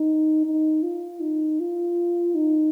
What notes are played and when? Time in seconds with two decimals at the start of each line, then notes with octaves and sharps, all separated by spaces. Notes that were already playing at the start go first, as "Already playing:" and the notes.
Already playing: D#4
0.46 D#4
0.83 F4
1.20 D#4
1.60 F4
2.35 D#4